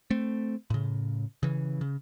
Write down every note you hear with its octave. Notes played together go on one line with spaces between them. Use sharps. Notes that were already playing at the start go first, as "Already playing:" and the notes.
A3 C4
A2 C#3
C#3 E3
C#3